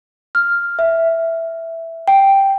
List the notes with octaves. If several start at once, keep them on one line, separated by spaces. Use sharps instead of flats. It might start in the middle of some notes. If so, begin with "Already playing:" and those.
F6
E5
G5